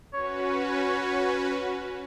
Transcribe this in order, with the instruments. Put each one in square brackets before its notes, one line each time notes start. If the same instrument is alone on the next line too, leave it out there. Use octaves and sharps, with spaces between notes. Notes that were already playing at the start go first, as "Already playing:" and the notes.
[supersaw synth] C#4 F#4 B4 [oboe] C#5